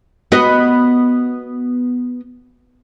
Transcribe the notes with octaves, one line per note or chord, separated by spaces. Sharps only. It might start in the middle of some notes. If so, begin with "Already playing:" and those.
B3 F#4 D#5